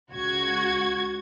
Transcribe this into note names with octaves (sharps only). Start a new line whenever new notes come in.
C#2 F#4 G#6